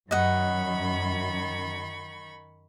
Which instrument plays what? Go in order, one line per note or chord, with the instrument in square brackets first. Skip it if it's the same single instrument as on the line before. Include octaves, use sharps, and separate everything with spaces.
[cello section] F#2 [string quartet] D#3 B5 C#6 [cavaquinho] D#5 F#5